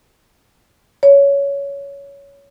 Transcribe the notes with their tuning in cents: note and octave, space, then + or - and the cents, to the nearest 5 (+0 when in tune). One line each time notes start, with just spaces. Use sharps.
C#5 +15